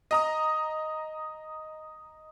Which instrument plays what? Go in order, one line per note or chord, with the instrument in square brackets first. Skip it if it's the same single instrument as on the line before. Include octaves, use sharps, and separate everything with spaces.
[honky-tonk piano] D#5 A#5 D#6